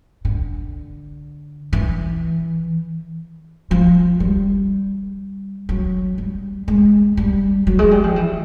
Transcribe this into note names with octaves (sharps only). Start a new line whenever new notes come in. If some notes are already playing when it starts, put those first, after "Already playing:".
D3
E3
F3
G3
F#3
G3
G#3
G3
F#3
G#3
G3
F3
E3